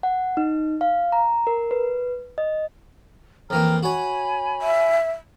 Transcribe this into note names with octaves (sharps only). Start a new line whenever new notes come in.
F#5
D#4
F5
A#5
A#4
B4
D#5
F2 E3 A#3 G5 A#5 F6
F#4 C#5 G#5 B5
E5